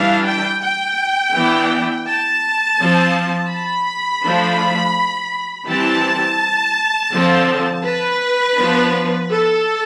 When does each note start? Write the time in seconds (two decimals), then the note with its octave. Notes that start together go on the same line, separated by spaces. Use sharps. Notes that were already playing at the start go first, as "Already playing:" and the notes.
Already playing: E3 G3 D4 F5
0.27 G5
0.63 G5
1.34 E3 B3 D4
2.07 A5
2.80 F3 C4
3.51 B5
4.25 F3 A3 D4
5.68 E3 G3 C4 A5
7.13 D3 F3 C4
7.85 B4
8.57 F3 B3 D4
9.30 A4